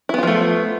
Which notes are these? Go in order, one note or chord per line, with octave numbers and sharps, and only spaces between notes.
F3 A3 B3 E4 F4